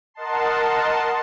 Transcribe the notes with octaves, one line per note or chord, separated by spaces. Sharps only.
A#4 D#5 F#5 A5 C6